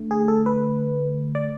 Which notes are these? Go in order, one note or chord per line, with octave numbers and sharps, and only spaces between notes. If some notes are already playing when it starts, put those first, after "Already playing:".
Already playing: D3 A3
G#4
A4
B4
D5